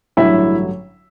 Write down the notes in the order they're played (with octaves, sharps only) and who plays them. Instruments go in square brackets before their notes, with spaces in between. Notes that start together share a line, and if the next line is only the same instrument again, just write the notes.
[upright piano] A1 G2 D3 F#3 E4 E5